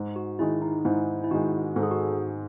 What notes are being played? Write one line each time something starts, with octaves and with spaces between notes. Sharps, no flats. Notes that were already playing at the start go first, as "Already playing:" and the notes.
Already playing: G#2
F#4
D#3 G#3 E4
D#4
G#2 E4
E4
D#3 G#3 F#4
G#2 A4
G#4
F#4